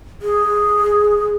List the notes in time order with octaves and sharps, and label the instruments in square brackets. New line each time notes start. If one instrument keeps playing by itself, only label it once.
[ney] G#4